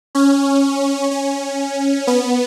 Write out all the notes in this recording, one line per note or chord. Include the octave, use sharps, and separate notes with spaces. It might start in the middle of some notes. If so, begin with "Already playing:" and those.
C#4
C#4
B3